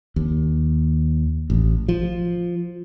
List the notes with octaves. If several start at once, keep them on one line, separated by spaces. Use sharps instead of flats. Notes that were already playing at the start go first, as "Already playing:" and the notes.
D#2
A1
F3